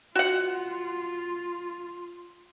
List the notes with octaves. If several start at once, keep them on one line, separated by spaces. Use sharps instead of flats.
F4 F#4 F#5